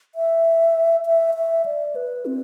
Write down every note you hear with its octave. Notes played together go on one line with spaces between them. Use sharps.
E5
E5
E5
D5
B4
C4